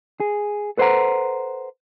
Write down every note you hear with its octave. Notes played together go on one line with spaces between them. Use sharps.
G#4
A4 B4 C5 D5 F#5 A#5